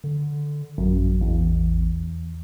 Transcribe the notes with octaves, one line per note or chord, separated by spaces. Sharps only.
D3
A1 F#2
E2